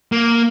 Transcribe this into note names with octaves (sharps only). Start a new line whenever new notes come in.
A#3